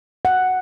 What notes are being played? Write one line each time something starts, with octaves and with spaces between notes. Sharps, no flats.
F#5